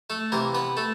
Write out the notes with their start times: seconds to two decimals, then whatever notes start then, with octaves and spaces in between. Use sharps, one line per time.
0.10 A3 A4
0.32 C3 E3 A#3 A#4
0.55 B3 B4
0.77 A3 A4